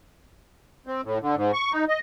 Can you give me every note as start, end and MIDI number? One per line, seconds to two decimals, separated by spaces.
0.87 1.01 60
1.04 1.18 45
1.21 1.35 50
1.36 1.51 44
1.53 1.72 85
1.73 1.85 63
1.88 2.00 75